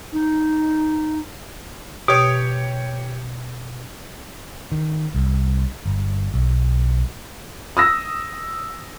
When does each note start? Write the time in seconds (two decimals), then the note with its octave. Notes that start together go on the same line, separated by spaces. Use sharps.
0.13 D#4
2.08 B2 G4 C#5
4.72 D#3
5.15 C2
5.86 G1
6.34 B1
7.77 D#6 E6 A#6